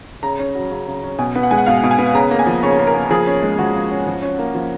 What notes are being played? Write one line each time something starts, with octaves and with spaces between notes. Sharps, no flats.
C#3 A#5
C#4
F#3
C#3
C#3
C#4
B2 G#5
B3
F#5
G#3 G#5
F#5
B2 F5
B2
G#5
B3
C#3 A#5
A#3
G#5
F3
C#3 C#5
C#3
A#4
A#3
F3 G#4
C#4
G#3
F3 F#4
F3
C#4
F3
C#4
A#3
F3